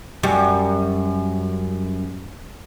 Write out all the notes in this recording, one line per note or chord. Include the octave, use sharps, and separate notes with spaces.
F#2 G3